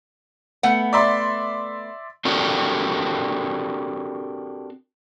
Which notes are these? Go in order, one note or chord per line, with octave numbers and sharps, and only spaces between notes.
A3 B3 F#5
D5 E5 C6
C4 D4 F#4 G4 A4 A#4